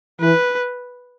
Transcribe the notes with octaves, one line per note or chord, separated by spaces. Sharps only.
E3 B4